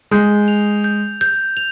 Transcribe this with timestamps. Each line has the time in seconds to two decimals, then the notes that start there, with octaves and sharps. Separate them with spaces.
0.11 G#3 G6
0.48 F7
0.84 G6
1.21 G6
1.57 F7